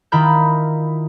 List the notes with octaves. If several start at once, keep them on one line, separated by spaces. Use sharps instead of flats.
D#3 E4 F4 A#5 B5 G6